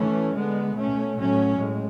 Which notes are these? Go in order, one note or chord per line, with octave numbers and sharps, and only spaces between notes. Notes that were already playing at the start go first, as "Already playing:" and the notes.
Already playing: E3 A3 C#4
D3 G#3 B3
B2 A3 C#4
A2 F#3 A3 C#4
A2 G#3